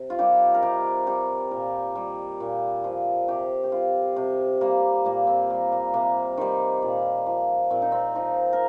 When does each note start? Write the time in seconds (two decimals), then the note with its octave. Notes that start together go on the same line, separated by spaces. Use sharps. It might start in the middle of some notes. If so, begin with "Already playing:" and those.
Already playing: C3
0.10 F4
0.18 D#3 G3 G4
0.54 A#4
0.62 C3 G4
1.07 G3 G4
1.51 A#2 A#4
1.95 G3
2.40 A#2
2.84 F3
3.28 C3 G4
3.64 G4
3.72 G3 F4
4.16 C3
4.61 G3 A#3
5.05 A#2 A#3
5.27 C4
5.50 G3 A#3
5.72 A#3
5.94 C3 A#3
6.37 D#3 G3
6.82 A#2
7.27 F3
7.70 A#2 C4
7.82 D#4
7.92 C4
8.15 F3 D#4
8.53 A#4